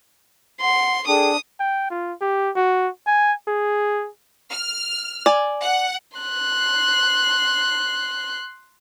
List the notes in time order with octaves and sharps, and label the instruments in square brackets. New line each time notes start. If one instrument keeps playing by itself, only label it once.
[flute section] F#5 [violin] C6
[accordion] D4 [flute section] G#4 A4 G5 [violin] D#6
[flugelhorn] G5
F4
G4
F#4
G#5
G#4
[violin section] F6
[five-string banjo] D5 G#5
[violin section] F#5
[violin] C6 F#6